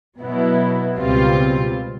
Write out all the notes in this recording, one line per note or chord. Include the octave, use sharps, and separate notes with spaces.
B2 F#3 B3 E4
C#2 B2 G3 C4 F4